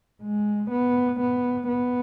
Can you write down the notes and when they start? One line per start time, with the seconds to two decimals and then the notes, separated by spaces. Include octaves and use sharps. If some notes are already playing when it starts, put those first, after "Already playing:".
0.23 G#3
0.71 B3
1.20 B3
1.68 B3